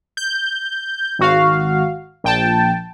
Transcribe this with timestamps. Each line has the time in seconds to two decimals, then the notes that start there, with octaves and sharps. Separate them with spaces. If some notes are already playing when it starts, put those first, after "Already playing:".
0.17 G6
1.19 G#1 F#4 F5
2.24 A#1 G5 A5